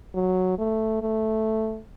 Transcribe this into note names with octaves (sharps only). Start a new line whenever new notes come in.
F#3
A3
A3